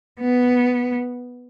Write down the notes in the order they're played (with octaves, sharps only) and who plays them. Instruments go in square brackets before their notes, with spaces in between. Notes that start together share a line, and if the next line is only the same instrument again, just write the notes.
[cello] B3